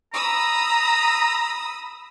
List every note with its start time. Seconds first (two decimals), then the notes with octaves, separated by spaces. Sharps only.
0.13 A#5 B5 D#6 E6